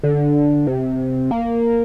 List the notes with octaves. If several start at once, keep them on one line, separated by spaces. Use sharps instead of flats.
D3
C3
A#3